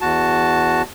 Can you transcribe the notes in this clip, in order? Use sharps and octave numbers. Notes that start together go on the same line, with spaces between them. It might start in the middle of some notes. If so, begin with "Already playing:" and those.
E2 F#4 A5